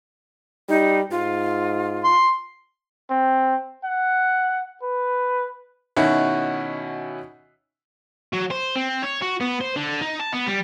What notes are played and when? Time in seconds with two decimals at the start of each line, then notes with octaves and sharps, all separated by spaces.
0.69 G3 D#4
1.11 G#2 F4
2.04 C6
3.10 C4
3.84 F#5
4.83 B4
5.96 B2 D#3 C#4 E4 F#4
8.33 F#3
8.51 C5
8.76 C4
9.02 C#5
9.21 F#4
9.40 B3
9.61 C5
9.76 D3
10.01 D#4
10.20 A5
10.33 B3
10.47 G3